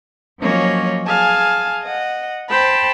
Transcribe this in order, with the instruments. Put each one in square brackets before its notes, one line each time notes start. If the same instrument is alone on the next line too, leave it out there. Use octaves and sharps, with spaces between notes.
[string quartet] F3 F#3 A#3 C#4 C#5 D#5
G#4 F5 G#5 A5
D#5 F#5
C5 G5 A5 B5